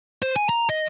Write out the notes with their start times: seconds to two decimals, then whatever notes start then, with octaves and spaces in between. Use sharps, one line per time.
0.22 C5
0.36 G#5
0.49 A#5
0.69 D#5